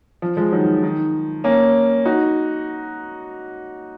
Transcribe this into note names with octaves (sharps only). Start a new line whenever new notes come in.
F3
F3 G#3
D#3 F#3
D#3
A#3 C#4
D#4 F#4